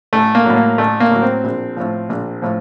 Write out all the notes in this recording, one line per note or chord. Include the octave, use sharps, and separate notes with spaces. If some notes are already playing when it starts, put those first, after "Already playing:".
A1 A3
A#3
A2 F#3
A#3
A1 A3
A#3
A2 F#3
C4
A#1
A2 F3
A#1
A2 F3